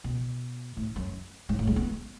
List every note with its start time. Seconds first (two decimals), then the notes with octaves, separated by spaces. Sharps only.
0.04 B2
0.77 A2
0.96 F#2
1.49 G#2
1.59 A2
1.67 G#3
1.76 B3